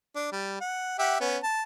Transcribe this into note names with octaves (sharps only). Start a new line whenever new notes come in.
D4
G3
F#5
G4 E5 F#5
B3 C#4
A5